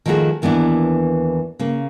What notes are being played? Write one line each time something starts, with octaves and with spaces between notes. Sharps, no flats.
D#3 F3 A3 F4 F#4 G#4
D#2 E3 B3 D4 E4
C#3 A#3